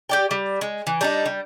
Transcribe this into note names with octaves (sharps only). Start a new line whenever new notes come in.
G4 D5 G5
G3
G#3
E3
G3 D4 D#4
G3